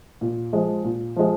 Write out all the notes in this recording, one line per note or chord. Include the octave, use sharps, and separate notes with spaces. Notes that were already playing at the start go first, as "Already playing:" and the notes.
A#2
F3 G#3
A#2
F3 G#3